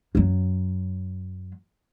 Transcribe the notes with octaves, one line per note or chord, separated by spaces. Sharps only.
F#2 F#3